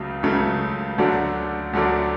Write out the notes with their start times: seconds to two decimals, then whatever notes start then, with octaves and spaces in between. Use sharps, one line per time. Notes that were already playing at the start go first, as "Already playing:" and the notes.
Already playing: C#2 C#3 F#3 A3
0.23 C#2 C#3 F#3 A3
0.98 D2 D3 F#3 A3 D4
1.73 D2 D3 F#3 A3 D4